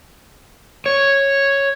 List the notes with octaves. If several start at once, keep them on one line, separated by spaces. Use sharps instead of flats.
C#5